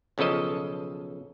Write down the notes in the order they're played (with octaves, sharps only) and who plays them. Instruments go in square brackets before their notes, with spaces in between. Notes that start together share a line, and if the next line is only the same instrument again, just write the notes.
[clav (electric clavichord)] B1 C#3 F3 A4 D#5